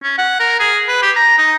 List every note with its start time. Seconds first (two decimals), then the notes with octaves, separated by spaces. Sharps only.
0.03 C#4
0.18 F#5
0.40 A#4
0.60 G#4
0.88 B4
1.02 G4
1.16 A#5
1.38 D#4